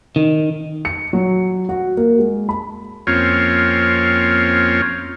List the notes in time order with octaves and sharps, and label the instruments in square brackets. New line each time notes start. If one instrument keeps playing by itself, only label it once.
[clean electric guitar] D#3
[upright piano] C#7
F#3
F#4
A#3
G#3
B5
[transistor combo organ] F2 A#3 C4 C#4 F4 C#5